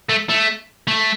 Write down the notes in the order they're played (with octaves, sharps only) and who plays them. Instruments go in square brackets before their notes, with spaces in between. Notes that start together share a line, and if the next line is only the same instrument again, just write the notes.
[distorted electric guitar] A3
A3
A3